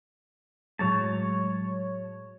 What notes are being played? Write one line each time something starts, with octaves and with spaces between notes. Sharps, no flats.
A2 F#3 G#3 C#5 A5